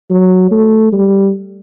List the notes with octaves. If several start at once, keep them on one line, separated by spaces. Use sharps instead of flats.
F#3
A3
G3